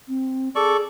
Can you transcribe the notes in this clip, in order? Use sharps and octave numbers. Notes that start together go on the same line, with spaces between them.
C4
G#4 A4 D5 C#6